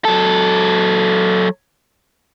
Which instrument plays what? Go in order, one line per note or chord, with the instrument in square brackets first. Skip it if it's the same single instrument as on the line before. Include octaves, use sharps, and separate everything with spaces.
[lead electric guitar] F#3 A4